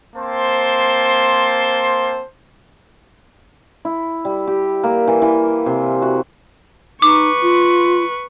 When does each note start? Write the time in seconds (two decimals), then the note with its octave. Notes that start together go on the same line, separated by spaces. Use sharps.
0.16 A#3 C4 C5 A5 C6
3.85 E4
4.25 G3
4.47 G4
4.83 A#3
5.07 E3
5.22 E3
5.66 C3
6.02 F#4
7.02 D#4 B4 C#6 D6
7.43 F4